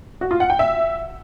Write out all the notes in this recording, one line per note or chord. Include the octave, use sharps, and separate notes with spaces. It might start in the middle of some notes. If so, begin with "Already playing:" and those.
F#4
F4
F#5
G5
E5